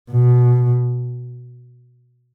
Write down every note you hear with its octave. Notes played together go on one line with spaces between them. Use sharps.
B2